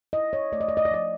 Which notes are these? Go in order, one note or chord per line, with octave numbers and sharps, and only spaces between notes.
E4 D#5
C#5
A3 D5
D#5
D5
D#5
D5
F3 D#5